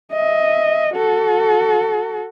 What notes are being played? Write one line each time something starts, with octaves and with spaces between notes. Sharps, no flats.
D#5 E5
F#4 A4